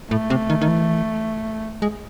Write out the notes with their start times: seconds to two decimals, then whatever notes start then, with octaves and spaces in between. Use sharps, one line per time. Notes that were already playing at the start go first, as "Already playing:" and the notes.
0.10 A2 A3
0.30 C3
0.50 D#3
0.61 D#3
0.68 E3
1.82 G#3